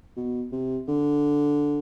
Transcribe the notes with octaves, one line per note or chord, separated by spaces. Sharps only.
B2
C3
D3